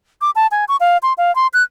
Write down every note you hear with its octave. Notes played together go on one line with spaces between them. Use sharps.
D6
A5
G#5
C#6
F5
C6
F5
C6
F#6